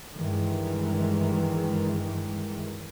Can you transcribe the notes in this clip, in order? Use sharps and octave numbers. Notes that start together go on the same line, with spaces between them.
G2 D#3 E3 G#3